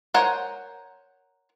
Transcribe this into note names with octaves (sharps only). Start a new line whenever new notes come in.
A#4 C5 C#5 F#5 G#5